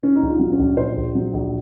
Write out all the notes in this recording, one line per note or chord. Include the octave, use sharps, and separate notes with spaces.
A#2 C#4
D#4
A#1
F4
F#3
C#4
A#1
A#2 C5
A#1
F#3
A#1